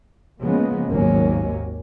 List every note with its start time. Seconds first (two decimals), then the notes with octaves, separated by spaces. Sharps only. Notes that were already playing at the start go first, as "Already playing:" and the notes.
0.43 C#3 F3 G#3 A#3 B3
0.89 G#1 D#2 G#2 F#3 A#3 C#4